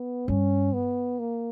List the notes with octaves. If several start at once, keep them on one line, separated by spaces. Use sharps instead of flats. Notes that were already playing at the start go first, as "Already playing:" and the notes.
Already playing: B3
G2 C#4
B3
A#3